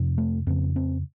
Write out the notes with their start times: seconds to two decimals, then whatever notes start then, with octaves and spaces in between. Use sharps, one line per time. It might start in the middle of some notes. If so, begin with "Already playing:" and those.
Already playing: F2 C3
0.18 A3
0.47 F2 C#3 C4
0.76 C4